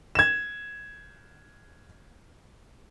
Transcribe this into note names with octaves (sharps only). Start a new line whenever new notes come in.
G#6 E7